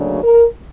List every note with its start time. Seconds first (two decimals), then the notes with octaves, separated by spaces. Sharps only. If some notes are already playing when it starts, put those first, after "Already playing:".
Already playing: D2 C#3 F#3 A#3 D4
0.23 A#4